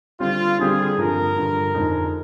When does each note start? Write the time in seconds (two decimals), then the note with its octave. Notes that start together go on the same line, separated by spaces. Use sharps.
0.20 D3 G3 C4 F4 G4
0.59 D3 G3 C4 G4 G#4
0.97 G2 D3 F3 A#4
1.36 G2 D3 F3
1.74 F2 D3 G#3 D#4